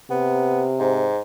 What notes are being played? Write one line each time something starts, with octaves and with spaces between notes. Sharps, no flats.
C3 B3
G#2